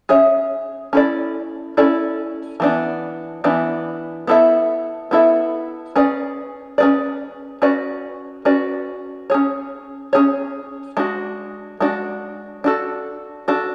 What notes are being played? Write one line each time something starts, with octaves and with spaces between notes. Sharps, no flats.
C#4 G#4 C#5 E5
C#4 E4 A4 D5
C#4 E4 A4 D5
E3 B3 D4
E3 B3 D4
B3 E4 A4 E5
B3 E4 A4 E5
C#4 G#4 B4 D5
C#4 G#4 B4 D5
C#4 F#4 B4 D5
C#4 F#4 B4 D5
C#4 G#4 C#5
C#4 G#4 C#5
G#3 D4 F#4
G#3 D4 F#4
D4 F#4 A4
D4 F#4 A4